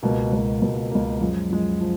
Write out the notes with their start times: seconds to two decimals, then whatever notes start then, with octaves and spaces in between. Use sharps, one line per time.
0.03 C#2 B2 A#3
0.33 C#2 B2 A#3
0.62 C#2 B2 A#3
0.91 C#2 B2 A#3
1.21 F#2 F3 G#3
1.50 F#2 F3 G#3
1.81 F3